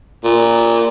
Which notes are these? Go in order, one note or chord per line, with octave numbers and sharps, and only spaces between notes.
A#2